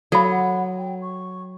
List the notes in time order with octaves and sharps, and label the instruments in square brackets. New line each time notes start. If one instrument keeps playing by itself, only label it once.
[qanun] F#3 [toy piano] A4 B5 [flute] F5
[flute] F#5
G5
C#6